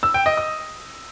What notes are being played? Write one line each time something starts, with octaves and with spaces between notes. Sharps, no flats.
E6
G5
D#5
D#6